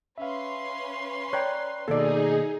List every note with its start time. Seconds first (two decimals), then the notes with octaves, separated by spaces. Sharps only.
0.18 C#4 B4 E5 F5 C6
1.33 C#5 D5 G5 A#5 F#6
1.88 B2 D#3 A#3 D#4 G#4 A4 D5